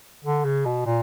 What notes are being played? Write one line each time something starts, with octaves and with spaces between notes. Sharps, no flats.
D3
C#3
B2
A#2